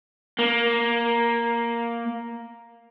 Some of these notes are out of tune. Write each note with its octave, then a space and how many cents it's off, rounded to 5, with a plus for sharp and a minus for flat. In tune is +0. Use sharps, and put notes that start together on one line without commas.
A#3 +5